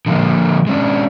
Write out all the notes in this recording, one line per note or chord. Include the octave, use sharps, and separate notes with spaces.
D3 F3 A#3
G#3 C#4 D4